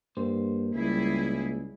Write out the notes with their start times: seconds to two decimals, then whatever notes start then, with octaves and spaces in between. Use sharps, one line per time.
0.17 G2 A#3 C5
0.75 C#2 G3 E4 G#4